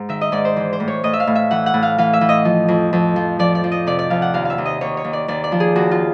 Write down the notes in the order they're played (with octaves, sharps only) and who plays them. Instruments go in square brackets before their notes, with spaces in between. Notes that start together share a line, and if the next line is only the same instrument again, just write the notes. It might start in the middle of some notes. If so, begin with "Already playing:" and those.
Already playing: [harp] G#2
D#3 E5
D#5
G#2 D5
C5
E3
C5
A2
C#5
A2 D#5
E5
F5
A2
E5
E3 F#5
F#5
A2
F5
E3 F5
E5
E3
D#5
F3
F2
F2
F3
F3 D5
D5
F3
D#5
C3 D5
D5
F2 F5
F#5
D#2 F5
E5 F5
D#2
D#5
D#2 C#5
C#5
D#2
D5
D#2 D5
D5
F3
G#4
D#2 F#4
F4